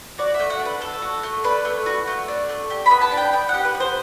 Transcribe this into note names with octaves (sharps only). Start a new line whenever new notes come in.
F#4 D5
E5
A3
F#5
D4
B4
A3 A4
F#4
A3
D4 B4
A3
F#4
A3
D4
A3
G4
B5
B3
A5
D4
G5
B3 G5
G4 F#5
B4
B3
C5